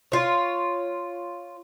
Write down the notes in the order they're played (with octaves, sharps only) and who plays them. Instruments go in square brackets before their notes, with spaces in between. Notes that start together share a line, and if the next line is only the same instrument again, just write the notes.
[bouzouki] F4 C#5